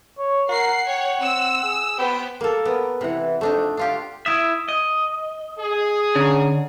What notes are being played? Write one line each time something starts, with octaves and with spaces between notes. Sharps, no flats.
C#5
A#4 F#5 C7
C#5 G5
C4 E6
G#4
B3 B4 C5 G5
A#3 A4 A#4
B3
C3 E3 F#5
F2 A3 D4 D#4
D3 D4 F4 G4 F5
E4 E5 D#6
D#5
G#4
D3 C#4 A#5